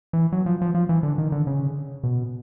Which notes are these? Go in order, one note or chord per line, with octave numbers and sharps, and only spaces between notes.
E3
F#3
F3
F3
F3
E3
D3
D#3
D3
C#3
B2